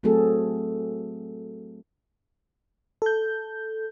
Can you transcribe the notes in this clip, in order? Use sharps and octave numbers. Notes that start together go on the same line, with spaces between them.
F#3 A3 C4 F#4 G#4 A4
A4 G6